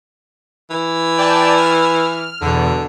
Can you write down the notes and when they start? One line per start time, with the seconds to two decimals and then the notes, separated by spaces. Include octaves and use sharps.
0.70 E3
1.18 D5 G5 A5
1.57 F6
2.41 E2 B2 D3